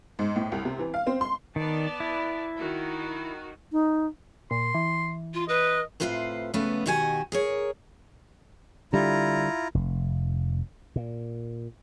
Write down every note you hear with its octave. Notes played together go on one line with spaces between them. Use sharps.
G#2
A2
C2
C3
E3
F5
C4
C6
D#3 B3 D5 A5
E4
D#3 F#4
D#4
A#2 C6
E3
F4
B4 D#5
A2 C3 E3 F4 B4 C5
C#3 F3 A3 B3 B4
B2 D#3 F#4 G4 A4 G#5
G#4 A#4 C#5
D3 G3 E4 F4 A#5
F1
A#2